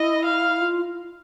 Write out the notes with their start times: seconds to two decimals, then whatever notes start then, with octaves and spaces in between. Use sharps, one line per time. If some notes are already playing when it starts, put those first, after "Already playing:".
Already playing: E4 D#5
0.25 F5
0.62 F4